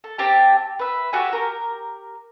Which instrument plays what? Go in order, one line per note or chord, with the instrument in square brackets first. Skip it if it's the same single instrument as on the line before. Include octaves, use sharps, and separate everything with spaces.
[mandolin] A4
C4 G4 A5
B4 E5
F#4 G4 A4 G#5
G4 A#4